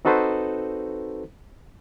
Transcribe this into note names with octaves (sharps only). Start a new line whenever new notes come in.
C4 D#4 F#4 A4 B4 C5